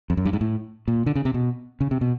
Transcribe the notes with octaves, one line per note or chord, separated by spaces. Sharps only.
F2
F#2
G2
G#2
A2
A#2
D3
C#3
C3
B2
C#3
C3
B2